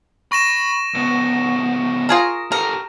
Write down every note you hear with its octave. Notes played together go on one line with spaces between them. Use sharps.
B5 C#6 A#6 E7
C#2 B3
F4 G#4 A#4
G4 A4 A#4